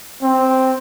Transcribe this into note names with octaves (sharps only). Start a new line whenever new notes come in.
C4